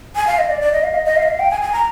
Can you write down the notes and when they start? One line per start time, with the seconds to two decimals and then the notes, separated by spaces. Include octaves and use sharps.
0.16 G#5
0.27 F5
0.38 D#5
0.50 D5
0.61 D5
0.72 D#5
0.84 F5
0.95 D#5
1.05 D#5
1.17 F5
1.23 D#5
1.28 F5
1.40 G5
1.51 G#5
1.62 G#5
1.73 A#5